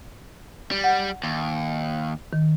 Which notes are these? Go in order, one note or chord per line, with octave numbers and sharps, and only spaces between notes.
G3
F#5
D#2
D#3